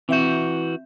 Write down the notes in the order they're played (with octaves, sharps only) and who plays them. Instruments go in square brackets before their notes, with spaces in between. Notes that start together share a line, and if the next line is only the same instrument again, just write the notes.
[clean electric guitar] E3 F#4 [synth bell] C4 E5 G6